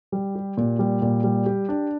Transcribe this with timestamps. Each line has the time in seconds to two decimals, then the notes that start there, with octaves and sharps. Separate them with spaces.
0.12 G3
0.35 G4
0.57 A#2
0.79 G3
1.02 A#2
1.24 G3
1.46 G4
1.69 D4